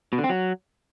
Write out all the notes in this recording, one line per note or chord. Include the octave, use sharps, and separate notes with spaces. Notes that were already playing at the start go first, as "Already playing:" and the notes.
B2
D3
C4
F#3